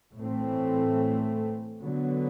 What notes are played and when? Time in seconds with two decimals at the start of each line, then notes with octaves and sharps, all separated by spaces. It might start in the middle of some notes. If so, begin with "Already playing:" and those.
0.18 A2 E3 A3 C4
1.81 D3 F#3 B3